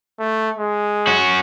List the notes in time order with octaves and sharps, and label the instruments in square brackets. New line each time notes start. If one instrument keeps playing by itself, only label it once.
[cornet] A3
G#3
[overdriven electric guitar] C#4 F#4